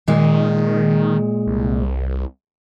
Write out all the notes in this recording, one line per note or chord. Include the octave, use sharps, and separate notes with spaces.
A#2 D#3 G#3
C2